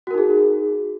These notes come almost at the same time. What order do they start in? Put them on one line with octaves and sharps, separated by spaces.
F#4 A#4 D#4 G#4